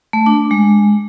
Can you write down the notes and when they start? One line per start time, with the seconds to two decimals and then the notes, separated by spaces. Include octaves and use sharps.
0.13 A3
0.26 D4
0.51 G#3